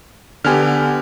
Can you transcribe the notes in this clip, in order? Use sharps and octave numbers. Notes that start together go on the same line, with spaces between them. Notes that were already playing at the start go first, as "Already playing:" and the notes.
D3 B3 G4 G#5 F6